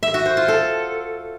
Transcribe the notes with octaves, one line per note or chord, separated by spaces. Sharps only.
E5
F#4
C5
F4
A4